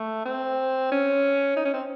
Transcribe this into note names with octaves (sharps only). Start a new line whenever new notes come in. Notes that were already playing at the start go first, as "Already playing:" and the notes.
Already playing: A3
C4
C#4
D#4
C#4
C4